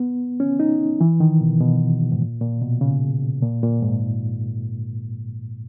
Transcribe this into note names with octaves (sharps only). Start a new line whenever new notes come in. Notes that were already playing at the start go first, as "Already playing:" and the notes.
Already playing: B3
C#4
D#4
E3
D#3
B2
B2
G#2
A#2
A#2
B2
C#3
A#2
A#2
G#2